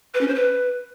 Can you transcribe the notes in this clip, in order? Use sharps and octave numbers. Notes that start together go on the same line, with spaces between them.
B4
C#4
C5
B4